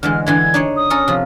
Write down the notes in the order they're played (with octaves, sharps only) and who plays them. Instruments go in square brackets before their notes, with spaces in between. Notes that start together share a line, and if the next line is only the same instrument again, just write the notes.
[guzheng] D3 E3 G#3 [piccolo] F6
[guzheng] D3 E3 G#3 [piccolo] G#6
[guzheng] D4 D#4 C#5
[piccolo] D#6
[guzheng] C#4 A4 A#4
C3 F3